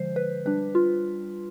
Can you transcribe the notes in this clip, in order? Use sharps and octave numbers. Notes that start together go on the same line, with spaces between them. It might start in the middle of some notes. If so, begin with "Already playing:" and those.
Already playing: D3 F3 G#3 C5
B4
G3 D4 B4
F4